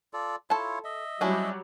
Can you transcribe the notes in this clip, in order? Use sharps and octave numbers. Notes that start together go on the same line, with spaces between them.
F4 A4 D5
E4 F4 A4 C#5 A5
D#5 E5
F#3 G3 C#4 D4 E4